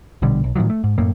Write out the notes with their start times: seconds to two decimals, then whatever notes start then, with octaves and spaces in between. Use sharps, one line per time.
0.22 A#1 B2 D3 G3
0.44 B1
0.56 A2 D#3 F3 F#3
0.70 A3
0.84 G#2
0.98 F#2 A2 A3 A#3